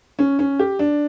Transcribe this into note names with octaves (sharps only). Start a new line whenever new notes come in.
C#4
C#4
G4
D4